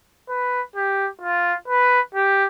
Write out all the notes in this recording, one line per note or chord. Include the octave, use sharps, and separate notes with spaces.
B4
G4
F4
B4
G4